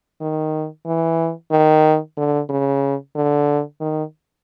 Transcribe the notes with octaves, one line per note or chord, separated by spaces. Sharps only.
D#3
E3
D#3
D3
C#3
D3
D#3